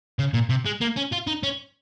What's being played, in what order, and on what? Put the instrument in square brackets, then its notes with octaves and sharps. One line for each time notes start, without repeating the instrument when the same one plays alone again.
[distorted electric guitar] C#3
A#2
C3
G#3
A#3
C#4
F4
D#4
C#4